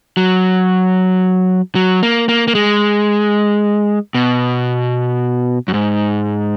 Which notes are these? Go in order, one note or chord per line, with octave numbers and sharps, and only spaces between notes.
F#3
F#3
A#3
A#3
A#3
G#3
B2
F#2
G#2